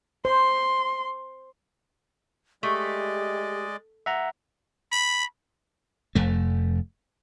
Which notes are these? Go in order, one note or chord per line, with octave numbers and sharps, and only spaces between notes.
C5 C6
G#3 A3 G4 D5 D#5
E5 F#5 A#5
B5
F1 F2 A3